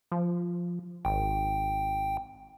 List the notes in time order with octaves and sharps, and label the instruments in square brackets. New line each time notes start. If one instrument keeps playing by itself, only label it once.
[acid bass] F3
[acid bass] G#1 [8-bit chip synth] G5